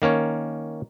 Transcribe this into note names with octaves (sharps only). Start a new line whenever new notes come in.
D#3 A#3 C#4 C#5